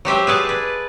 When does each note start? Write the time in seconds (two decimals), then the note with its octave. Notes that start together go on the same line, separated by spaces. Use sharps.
0.05 F#3 G4 C5 E5
0.27 G#4 B4 D5 A5
0.49 B4